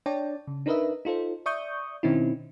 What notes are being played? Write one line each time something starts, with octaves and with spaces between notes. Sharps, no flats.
D4 C#5 D5 G5 A5
C#3
D4 D#4 A#4 B4 D#5 E5
D#4 F4 A4 C5
D5 E5 C#6 D#6 G6
B2 D#3 C4 C#4 D#4 E4